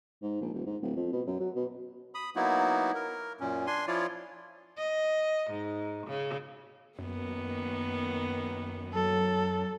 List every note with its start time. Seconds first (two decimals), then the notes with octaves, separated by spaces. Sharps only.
0.22 G#2
0.41 A#1
0.53 D#1
0.66 G#2
0.82 D1
0.96 F2
1.12 B2
1.27 F#2
1.40 F#3
1.56 B2
2.15 B5 D#6
2.36 F#3 A#3 B3 D#4 E4 F#4
2.95 A#4
3.40 F#2 A#2 C#4
3.67 D4 G#5 C6
3.87 F3 E4 F4 C#5 D5
4.78 D#5
5.50 G#2
6.07 C#3
6.99 F#2 D#3 A#3 B3
8.93 F#3 A4